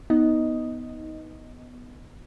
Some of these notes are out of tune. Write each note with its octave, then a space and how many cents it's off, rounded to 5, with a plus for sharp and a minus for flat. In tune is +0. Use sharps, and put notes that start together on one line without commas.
B3 +0 D#4 +15 D#5 +0